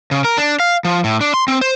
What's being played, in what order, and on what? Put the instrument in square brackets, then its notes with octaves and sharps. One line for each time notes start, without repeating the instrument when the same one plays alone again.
[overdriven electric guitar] C#3
A#4
D4
F5
F3
A2
D4
C6
C4
C5